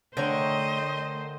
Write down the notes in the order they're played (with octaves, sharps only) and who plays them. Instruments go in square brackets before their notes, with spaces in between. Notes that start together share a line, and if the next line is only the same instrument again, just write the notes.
[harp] D3 G5 [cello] A3 D#5 [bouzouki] A#4 C#5 [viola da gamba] C5